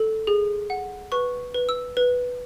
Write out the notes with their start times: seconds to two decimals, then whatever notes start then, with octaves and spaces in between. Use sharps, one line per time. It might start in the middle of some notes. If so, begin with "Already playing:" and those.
Already playing: A4
0.27 G#4
0.70 F#5
1.12 B4 C#6
1.54 B4
1.69 E6
1.97 B4